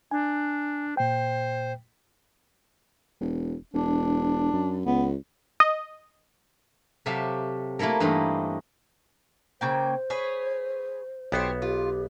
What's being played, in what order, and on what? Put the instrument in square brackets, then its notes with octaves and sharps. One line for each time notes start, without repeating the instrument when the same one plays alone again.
[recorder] D4 [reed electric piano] G#5
[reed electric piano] A#2 G5 [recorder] C5
[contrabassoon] E1
[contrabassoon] E1 [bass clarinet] D4
[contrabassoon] F#2
[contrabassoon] C#2 [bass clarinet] B3
[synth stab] D#5
[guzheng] C3 F#3 G4 A4 E5 F5
A3 A#3 E4 A4 A#4
G2 E3 A3 A#3 C4 D#4
[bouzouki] C#3 A#3 G5 [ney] C5
[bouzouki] G#4 B4 C#5
[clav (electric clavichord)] B1 B3 [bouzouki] G4 C5 C#5
[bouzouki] F4 [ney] G4